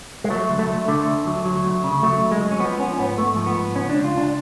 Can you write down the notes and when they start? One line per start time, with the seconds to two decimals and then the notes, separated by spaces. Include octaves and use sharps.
0.24 G#3
0.30 F#3 A3
0.49 D2
0.59 A3
0.69 D2
0.88 D3 A3
1.07 D2
1.26 F#3
1.45 F#3
1.64 D2
1.84 C#3
2.03 F#3 A3
2.22 D2
2.32 G#3
2.41 F#3
2.51 C#4
2.60 F3 B3
2.79 F3 C#4
2.93 C#4
2.98 G#2 B3
3.17 G#2 A3
3.36 F3
3.46 B3
3.56 G#2
3.75 C#2 C#4
3.89 C#2 D4
4.04 F4
4.14 C#2 D4